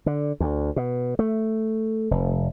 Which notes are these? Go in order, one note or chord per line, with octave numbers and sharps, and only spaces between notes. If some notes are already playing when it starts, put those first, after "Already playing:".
D3
D2
B2
A3
F1